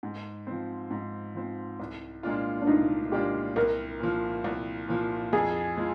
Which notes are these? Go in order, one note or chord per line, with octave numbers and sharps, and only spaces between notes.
G#2
F3 C4
G#2
F3 C4
C2
A#2 G#3 D4 F4
D4
C2 D#4
A#2 G#3 D4 F4 G4
C2 A#4
A#2 F3
C2
A#2 F3
F2 G#4
F3 G#3